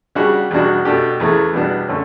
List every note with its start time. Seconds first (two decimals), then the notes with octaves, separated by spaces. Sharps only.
0.15 C#3 G3 D4 F#4
0.51 E2 B2 G3 D4 F#4
0.85 B2 A3 D4 G4
1.20 E2 C#3 E3 A3 E4
1.53 E2 B2 G3 B3 D4
1.88 D3 A3 C#4